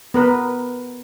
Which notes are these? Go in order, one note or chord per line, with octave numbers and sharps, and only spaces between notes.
B3 A#4 B4